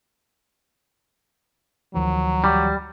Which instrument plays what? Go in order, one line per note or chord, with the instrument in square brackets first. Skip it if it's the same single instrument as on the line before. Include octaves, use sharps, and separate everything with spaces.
[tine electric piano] D2 D#3 F3 [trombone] F#3
[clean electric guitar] G3